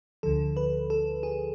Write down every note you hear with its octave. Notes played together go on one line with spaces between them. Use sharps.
D2 D3 F3 A4
B4
A4
G#4